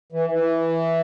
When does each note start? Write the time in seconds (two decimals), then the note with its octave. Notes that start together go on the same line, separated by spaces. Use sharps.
0.12 E3
0.32 E3